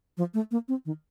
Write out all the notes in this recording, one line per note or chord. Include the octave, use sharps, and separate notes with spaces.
F3
A3
A#3
C4
D#3